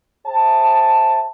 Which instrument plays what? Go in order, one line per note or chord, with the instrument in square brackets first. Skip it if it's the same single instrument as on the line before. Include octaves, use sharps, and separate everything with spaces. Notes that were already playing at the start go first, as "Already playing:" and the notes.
[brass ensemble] G#4 C5 E5 G5 A5